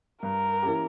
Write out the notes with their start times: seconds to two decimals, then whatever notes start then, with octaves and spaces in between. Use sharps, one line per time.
0.23 G2 A#4
0.63 E3 A#3 C#4 G4